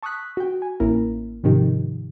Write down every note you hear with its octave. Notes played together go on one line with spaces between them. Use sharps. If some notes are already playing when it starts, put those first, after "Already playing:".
A5 C#6 D#6 E6 F#6 B6
F#4 G5
G#5
A1 A#3 C#4 E4 A#4
G#2 C3 D#3 F3 D#4 G4